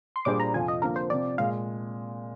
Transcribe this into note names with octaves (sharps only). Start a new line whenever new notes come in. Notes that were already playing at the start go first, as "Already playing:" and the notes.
C6
A#2 G3 D4 G#4 C5 D6
A#5
F2 C3 F3 C4 F4 G#5
D#5
D3 F3 A#3 A#4
C5
C3 F3 C4 D5
A#2 G#3 F5